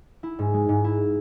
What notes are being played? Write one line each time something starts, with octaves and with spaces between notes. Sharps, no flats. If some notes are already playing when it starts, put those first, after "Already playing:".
E4
G#2
G#3
G#2
E4